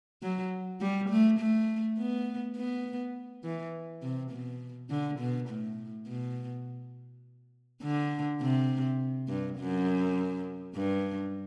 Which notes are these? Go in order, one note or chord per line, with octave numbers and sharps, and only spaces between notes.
F#3
G3
A3
A3
B3
B3
E3
C3
B2
D3
B2
A2
B2
D3
C3
G2
F#2
G2